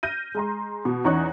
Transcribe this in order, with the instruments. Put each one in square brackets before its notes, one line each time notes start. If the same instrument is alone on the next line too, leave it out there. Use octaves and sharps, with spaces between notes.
[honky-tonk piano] F6 G6 A#6 D#7
G#3 A#5 C6
B2
E2 C#4 D#4 C#5 C#6 F#6